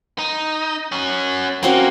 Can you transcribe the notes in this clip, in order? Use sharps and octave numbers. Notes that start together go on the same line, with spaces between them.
D#4
C#4 F#4
A#3 C4 C#4 F#4